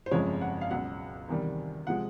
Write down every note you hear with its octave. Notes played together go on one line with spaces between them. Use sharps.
C5
G1 F2 C#3 F3 G#3 C#5
F#5
F5
C#2 B2 F#3 F#5
E2 C3 D#3 G3
C3 F3 G#3 F#5